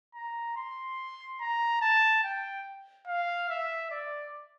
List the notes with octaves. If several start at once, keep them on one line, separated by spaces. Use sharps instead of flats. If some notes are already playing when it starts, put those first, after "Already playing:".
A#5
C6
A#5
A5
G5
F5
E5
D5